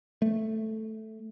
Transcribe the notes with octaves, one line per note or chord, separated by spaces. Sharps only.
A3